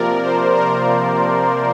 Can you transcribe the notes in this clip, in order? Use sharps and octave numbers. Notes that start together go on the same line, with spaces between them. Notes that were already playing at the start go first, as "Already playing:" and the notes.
Already playing: C3 F3 A#3 A#4 D5
C5
A#4